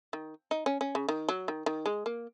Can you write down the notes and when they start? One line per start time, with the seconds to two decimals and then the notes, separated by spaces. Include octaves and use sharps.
0.13 D#3
0.51 D#4
0.66 C#4
0.81 C#4
0.95 C#3
1.08 D#3
1.28 F#3
1.48 D#3
1.66 D#3
1.86 G#3
2.06 A#3